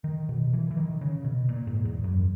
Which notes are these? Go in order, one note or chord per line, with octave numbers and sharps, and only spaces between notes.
D#3
B2
E3
E3
D#3
C#3
B2
A#2
G#2
E2
F#2